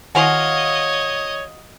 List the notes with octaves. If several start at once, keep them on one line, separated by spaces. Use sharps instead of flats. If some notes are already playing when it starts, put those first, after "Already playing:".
D#3 E4 F#4 C#5 D#5 F5 F#5 C6